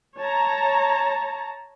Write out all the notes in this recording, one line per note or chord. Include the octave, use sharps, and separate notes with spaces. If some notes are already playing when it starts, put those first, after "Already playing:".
C#5 A5 A#5